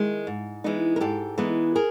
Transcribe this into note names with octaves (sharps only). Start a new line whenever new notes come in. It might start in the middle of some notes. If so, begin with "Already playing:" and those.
Already playing: D#3 G#3 E4
G#2
E3 G#3 B3 D#4
A#4
G#2 G4 A4
E3 G#3 B3 D#4
G#4 A#4